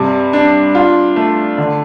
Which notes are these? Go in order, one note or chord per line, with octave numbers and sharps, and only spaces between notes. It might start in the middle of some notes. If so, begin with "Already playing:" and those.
Already playing: G2 C3
D4
F4
A3
D3